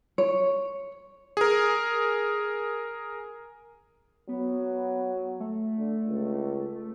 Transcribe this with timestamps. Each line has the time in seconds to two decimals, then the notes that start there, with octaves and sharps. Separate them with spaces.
0.18 C#5
1.37 G#4 A#4
4.29 F#3 B3
5.40 A3
5.78 D3
6.07 C#2